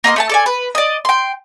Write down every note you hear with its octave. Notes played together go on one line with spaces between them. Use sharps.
A#3 D#5 F5 C6
A3 G#5 A5
A4 D5 G#5
B4
D5 D#5
G5 C6